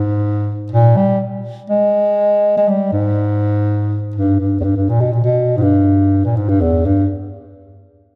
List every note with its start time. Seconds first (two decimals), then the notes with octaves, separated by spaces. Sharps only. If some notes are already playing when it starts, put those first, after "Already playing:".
Already playing: G#2
0.72 A#2
0.97 G3
1.70 G#3
2.58 G#3
2.69 G3
2.93 G#2
4.16 G2
4.40 G2
4.60 E2
4.64 G2
4.76 G2
4.90 A#2
5.01 B2
5.13 A#2
5.24 B2
5.57 G#2
5.62 G2
6.25 A#2
6.37 G#2
6.49 G2
6.61 E2
6.85 G2